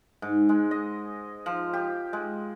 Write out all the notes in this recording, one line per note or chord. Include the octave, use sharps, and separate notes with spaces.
G#2
G#3
D#5
F3
G4
G#3